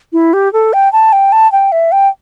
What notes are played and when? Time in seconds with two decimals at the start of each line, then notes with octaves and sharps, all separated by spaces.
0.13 E4
0.33 G4
0.53 A4
0.73 G5
0.92 A5
1.12 G5
1.32 A5
1.52 G5
1.72 E5
1.92 G5